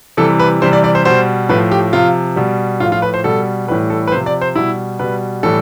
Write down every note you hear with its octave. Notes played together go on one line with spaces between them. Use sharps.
C3 E3 G3 A4
B4
C3 E3 G3 C5
D5
D5
C5
B2 G3 C5
A2 F3 B4
G4
C3 F3 F4
B2 G3
A2 F3 F4
F4
B4
C5
B2 G3 A4
A2 E3 G3 B4
A4
B4
C3 F3 C5
D5
C5
B2 G3 E4
B2 G3 B4
A2 E3 G3 A4